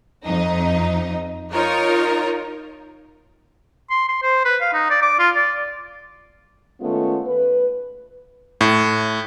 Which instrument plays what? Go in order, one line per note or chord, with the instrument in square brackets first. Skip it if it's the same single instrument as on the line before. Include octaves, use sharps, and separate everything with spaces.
[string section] F2 D#4
D#4 F4 A#4 C#5
[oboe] C6
C6
C5
B4
F5
D#4
D5
D6
F4
D5
[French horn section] D#3 G#3 A3 B3 C#4 F4
B4
[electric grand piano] A2